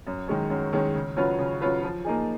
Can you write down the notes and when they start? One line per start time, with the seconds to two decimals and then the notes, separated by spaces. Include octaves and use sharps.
0.07 F#2
0.28 D#3 G#3 C#4
0.50 F#2
0.73 D#3 G#3 C#4
0.95 C#3
1.17 F#3 C#4 F4 B4
1.39 C#3
1.61 F#3 C#4 F4 B4
1.83 F3
2.04 A#3 D#4 G#4